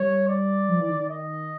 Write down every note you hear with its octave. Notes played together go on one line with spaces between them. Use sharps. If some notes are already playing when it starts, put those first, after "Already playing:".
Already playing: G3 C#5
D5
F3
E3
D#3
D#3
D#5